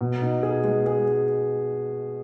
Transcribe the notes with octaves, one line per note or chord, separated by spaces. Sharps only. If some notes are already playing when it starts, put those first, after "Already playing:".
B2
D#4
G#4
G#3
G#4